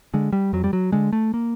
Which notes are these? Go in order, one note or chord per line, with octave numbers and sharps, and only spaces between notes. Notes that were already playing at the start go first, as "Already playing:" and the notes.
D3 G#3
G3
F2 F#3
G3
F#3
D3 G#3
A3
A#3